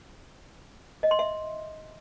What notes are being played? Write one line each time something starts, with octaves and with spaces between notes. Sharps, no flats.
D#5
C6
E5